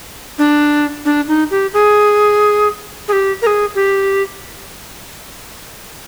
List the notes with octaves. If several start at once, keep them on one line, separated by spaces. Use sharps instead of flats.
D4
D4
D#4
G4
G#4
G#4
G4
A#4
G#4
G4